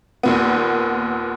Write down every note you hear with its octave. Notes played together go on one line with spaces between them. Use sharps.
D#2 A#2 B3